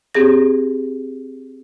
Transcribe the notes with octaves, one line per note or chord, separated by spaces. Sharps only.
C4 G4 G#4 A#6